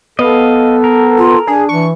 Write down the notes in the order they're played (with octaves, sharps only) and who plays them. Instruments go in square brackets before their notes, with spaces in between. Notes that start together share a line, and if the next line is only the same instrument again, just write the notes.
[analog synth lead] B3 [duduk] A4 [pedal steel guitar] D#5 F5
[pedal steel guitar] A#4
[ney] F4
[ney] D4 [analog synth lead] G#4
[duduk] E3 [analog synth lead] C#6